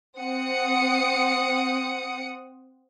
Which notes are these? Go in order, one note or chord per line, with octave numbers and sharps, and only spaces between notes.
C4 F#5 D#6 C#7